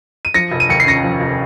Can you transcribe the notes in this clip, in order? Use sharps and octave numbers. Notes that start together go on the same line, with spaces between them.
D#7
F3 A#6 C#7
F1
D#7
D#2 C#7
C7
C#3 A#6 C#7
F3
F1